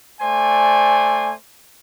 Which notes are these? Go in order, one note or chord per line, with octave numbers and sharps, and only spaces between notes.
A3 C5 D5 G#5